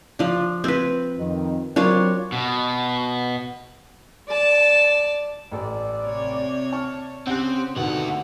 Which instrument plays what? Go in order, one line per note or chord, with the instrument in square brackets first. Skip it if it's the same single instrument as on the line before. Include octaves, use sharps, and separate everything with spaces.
[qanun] F3 D4
C4 B4
[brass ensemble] F2 D#3
[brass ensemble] F#3 C4 A#4 [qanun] D4 F4 C#5
[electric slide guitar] B2
[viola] D5 A5
[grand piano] A1 A4 [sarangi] D5
[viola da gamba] C3 C4 C#5
[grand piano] A5 C#6 F6
[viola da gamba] C#3 [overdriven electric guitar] C4 [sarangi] G4 [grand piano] F#5 F#6
[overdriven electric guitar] D2 F#5 [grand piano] B2 D#3 [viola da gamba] D3 [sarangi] C4